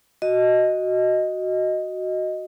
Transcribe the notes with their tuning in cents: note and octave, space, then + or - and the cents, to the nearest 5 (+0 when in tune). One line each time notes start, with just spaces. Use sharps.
F#4 +0 D#5 +0